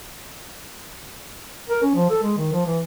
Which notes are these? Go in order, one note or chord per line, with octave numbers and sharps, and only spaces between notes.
A#4
C#4
F3
A4
G#3
D#3
F3
E3